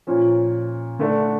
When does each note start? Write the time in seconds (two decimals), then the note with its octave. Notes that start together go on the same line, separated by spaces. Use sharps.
0.07 A#2 F3 C#4
0.99 D3 A3 D4